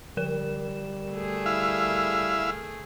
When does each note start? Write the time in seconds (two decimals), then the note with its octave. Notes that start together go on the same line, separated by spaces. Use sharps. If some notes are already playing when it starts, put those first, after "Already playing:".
0.17 D3 G3 A#4 E7
1.13 A3 G#4
1.46 E4 E5 F5